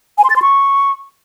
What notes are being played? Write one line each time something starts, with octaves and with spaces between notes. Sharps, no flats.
G#5
C6
A6
C6
C#6